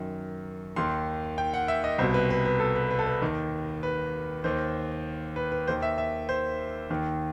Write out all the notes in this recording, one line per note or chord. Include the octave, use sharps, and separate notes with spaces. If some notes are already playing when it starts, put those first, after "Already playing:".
Already playing: F#2 D#3
D#2 D#3 C6
G5
F#5
E5
D#5
C2 B2 C5
B4
B4
B4
A4
B4
B4
A4
B4
D#2 D#3
B4
D#2 D#3 C5
B4
B4
D#2 D#3 C5
E5
E5
C5
D#2 D#3